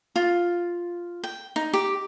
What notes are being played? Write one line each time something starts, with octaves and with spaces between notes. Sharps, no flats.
F4
G5
D#4
G4